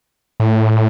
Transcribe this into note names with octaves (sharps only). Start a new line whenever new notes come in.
A2